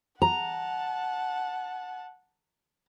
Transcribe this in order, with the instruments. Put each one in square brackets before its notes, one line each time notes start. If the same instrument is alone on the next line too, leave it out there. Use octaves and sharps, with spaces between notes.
[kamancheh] F#5 A5 [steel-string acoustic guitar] A#5